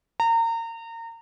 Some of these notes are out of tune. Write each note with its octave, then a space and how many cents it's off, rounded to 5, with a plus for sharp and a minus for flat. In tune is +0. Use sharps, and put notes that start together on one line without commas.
A#5 -30